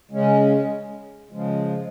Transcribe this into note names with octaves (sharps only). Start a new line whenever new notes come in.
C#3 G#3 C#4
C#3 F3 G#3